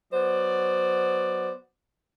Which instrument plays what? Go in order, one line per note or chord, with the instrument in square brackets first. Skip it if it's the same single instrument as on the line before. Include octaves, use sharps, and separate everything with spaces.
[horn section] F#3 B3 C5 D5